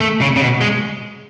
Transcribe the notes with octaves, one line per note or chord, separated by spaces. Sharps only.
A3
C#3
C#3
B2
G#3